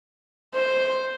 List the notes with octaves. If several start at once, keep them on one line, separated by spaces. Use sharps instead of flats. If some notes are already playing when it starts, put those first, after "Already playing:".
C5